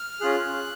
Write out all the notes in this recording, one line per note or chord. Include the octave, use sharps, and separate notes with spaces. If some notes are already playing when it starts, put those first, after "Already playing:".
Already playing: F6
C#4 F4 G#4 F#6